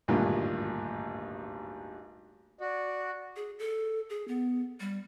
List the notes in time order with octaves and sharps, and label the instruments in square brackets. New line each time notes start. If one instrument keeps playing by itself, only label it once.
[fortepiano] G#1 D2 G2 A#2
[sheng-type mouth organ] F#4 [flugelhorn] D5
[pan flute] G#4
A4
G#4
B3
G3